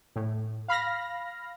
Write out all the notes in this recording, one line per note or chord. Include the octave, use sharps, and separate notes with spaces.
A2
F5 B5 F6 A#6